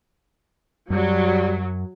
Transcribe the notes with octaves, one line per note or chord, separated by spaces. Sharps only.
F#2 F#3 G3